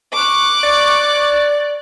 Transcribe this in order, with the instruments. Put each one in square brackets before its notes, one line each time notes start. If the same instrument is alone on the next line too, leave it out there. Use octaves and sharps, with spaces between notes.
[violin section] C#6 F#6 [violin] D6
[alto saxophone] D5